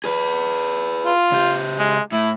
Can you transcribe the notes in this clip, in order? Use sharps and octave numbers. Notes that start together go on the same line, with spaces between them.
G#4 B4
F4
C#3 G4
G#3
A2 E4